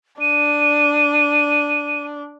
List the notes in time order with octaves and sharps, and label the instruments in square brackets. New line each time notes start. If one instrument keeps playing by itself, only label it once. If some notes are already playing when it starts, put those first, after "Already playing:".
[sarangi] D4 [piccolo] D#7